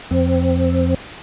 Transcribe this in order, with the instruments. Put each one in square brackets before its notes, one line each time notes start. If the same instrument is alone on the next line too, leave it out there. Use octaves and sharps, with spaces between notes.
[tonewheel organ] F2 C4